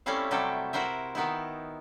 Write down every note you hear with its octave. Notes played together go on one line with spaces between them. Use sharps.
G3 A3 C4 C#4 E4 F5
C3 F#3 G3 G4 A4
E4 F#4 A#4 C5 E5
D#3 B3 D#4 E4